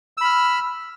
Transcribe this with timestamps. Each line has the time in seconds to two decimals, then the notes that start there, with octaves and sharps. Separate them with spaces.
0.17 E6
0.21 B5
0.25 F6